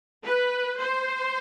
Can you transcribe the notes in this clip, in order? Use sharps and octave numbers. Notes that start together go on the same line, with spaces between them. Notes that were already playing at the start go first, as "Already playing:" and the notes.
B4
C5